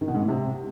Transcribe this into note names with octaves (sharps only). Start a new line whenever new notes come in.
D#3
B2
G#2
A2
C3